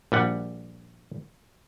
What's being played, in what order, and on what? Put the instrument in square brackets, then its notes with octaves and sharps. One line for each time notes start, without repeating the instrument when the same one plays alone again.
[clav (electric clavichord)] A#1 G3 F#5